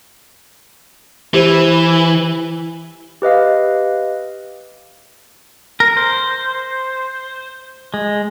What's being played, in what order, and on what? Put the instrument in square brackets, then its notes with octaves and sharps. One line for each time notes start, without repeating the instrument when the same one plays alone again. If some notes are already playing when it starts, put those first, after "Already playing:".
[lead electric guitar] E3 [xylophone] G4 C5 D#7
[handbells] G4 B4 D#5 F5
[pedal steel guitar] A#4
C5
G#3